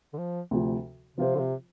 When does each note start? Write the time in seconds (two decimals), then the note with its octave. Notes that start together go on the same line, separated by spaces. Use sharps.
0.13 D3
0.18 F3
0.51 D2 C3 F3
1.17 C3 F3 C4 F4 C5
1.35 D3
1.39 C3